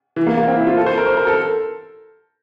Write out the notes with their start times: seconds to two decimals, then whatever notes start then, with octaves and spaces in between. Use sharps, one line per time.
0.16 E3
0.27 A#3
0.37 A#3
0.48 C4
0.56 E4
0.67 F4
0.77 A4
0.86 C5
0.98 A#4
1.07 C5
1.17 A#4
1.27 A4